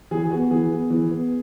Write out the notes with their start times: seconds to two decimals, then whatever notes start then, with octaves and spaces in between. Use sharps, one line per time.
0.11 E3 G#4
0.24 G#4
0.31 B3 F#4
0.51 E3 G#4
0.71 B3
0.90 E3
1.10 B3